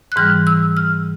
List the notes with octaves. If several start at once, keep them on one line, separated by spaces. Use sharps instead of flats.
F#6
G#2 E3 G3 F6
E6
F6